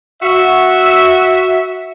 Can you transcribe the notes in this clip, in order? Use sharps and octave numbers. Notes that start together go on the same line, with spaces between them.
F#4 E5